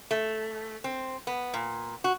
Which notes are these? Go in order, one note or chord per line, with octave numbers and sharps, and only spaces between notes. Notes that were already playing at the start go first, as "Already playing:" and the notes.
A3
C4
B3
A#2
F#4